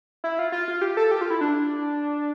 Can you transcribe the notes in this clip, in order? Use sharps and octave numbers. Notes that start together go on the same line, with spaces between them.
E4
F4
F4
F4
G4
A4
G4
F4
E4
D4